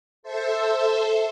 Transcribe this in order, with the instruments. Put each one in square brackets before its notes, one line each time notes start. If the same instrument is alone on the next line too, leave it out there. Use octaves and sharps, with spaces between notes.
[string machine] A4 C5 E5